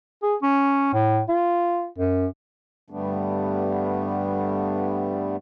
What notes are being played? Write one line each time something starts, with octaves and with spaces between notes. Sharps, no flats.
G#4
C#4
A2
F4
F#2
G2 D3 G3 A3 B3 D4